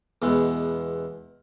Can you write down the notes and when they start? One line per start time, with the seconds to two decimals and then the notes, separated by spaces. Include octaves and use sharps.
0.22 E2 B2 G#3 B3